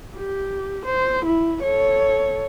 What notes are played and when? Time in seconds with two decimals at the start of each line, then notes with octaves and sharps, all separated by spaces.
0.16 G4
0.85 C5
1.25 E4
1.62 A4 C#5